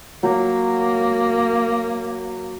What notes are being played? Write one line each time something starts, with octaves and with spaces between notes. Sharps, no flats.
F#3 A#3